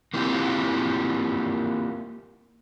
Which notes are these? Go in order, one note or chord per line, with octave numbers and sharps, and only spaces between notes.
A#3 C4 E4 F4 G4